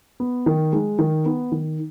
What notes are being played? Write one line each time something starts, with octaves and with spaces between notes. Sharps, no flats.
B3
D#3
G#3
D#3
B3
D#3